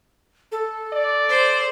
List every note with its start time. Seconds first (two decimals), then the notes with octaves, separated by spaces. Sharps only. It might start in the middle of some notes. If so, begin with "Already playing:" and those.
0.52 A4
0.93 D5
1.29 C5